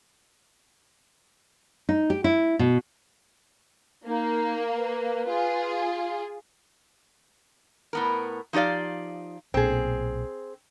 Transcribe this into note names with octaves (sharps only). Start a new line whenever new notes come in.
D#4
G4
E4
B2
A#3 D#4
B4
F4 G#4
A2 B3 A#4
F3 D#4 G4 D5 F5
B1 A#2 C4 G#4